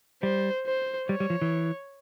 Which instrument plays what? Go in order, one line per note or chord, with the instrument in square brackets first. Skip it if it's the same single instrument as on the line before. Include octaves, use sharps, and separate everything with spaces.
[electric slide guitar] G3 [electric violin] C5
[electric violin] C5
[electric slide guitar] G3 [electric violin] C#5
[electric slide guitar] G3
F3
E3